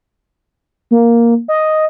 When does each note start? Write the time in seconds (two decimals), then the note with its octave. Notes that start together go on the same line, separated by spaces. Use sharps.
0.91 A#3
1.48 D#5